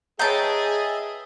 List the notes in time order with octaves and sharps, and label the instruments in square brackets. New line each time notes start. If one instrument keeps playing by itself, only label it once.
[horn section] G#4 [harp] B4 C#5 A#5 [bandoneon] D#5 E5 [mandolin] G5 A5